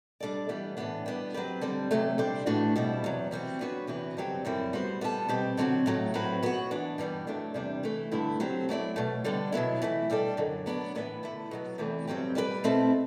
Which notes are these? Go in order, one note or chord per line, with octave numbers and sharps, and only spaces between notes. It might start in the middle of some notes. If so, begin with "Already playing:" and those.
G3 D4 A4 D5
E3 G3 B3
A2 E3 B3 D4
G3 B3 D4
F#3 C4 G4 B4
D3 G3 C4
E2 C3 F#3 A3
G3 D4 G4 C5
A2 E3 A3 D4 F#4
B2 G3 C4 E4
E2 C3 F#3
E3 G3 C4 F#4
F#3 B3 D4 F#4 B4
E2 C3 E3 B3 F#4
G2 D3 F#3 C4 G4
F#2 D3 G3 C4 E4
G3 B3 F#4 C5
G3 B3 E4 A4
B2 G3 C4 G4
D3 F#3 C4 F#4
A2 F#3 A3
A2 F#3 C4 F#4 B4
F#3 B3 F#4
E3 B3 D4
G2 E3 G3 B3
G2 F#3 A3 D4
E2 C3 G3 D4
E3 A3 E4
G2 D3 A3 E4
F#3 C4 G4 C5
F#3 A3 E4 B4 D5
B2 F#3 A3
D3 G3 B3 D4
B2 F#3 B3 E4
E3 A3 E4
B2 G3 D4 A4 D5
F#2 D3 F#3
F#3 B3 D4 A4 D5
A2 E3 B3 E4 B4
D3 A3 E4
B2 F#3 B3
E2 C3 E3 A3
G2 F#3 C4 G4
G3 D4 G4 B4 D5
B2 A3 C4 E4 A4